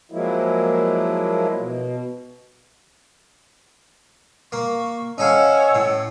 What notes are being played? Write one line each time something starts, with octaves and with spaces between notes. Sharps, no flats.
F3 F#3 G#3 A#3 E4
B2
A#3 C#6
C#4 D#4 A4 C#5 F5 F#5 E6
A2